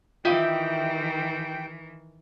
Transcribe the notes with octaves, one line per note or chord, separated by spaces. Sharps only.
D#3 E3 E4 F4 G4 D#5 F5 G5